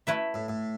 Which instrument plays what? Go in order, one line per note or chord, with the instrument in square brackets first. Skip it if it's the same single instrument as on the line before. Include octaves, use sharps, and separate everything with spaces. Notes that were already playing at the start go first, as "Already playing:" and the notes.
[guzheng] A3 E4 B4 E5
[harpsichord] A2
A2